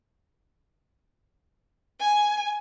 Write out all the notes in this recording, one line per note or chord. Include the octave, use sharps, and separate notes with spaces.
G#5